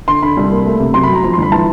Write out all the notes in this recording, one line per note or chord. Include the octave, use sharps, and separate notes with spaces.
D3 C6
D3 B5
C2
A#3
A3
C3
F#2 C6
B5
F#3 A#5
F3 A#5
C6
G1 B5
E3 A5